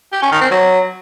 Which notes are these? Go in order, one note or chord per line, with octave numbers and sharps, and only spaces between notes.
G4
C#4
D#3
C4
F#3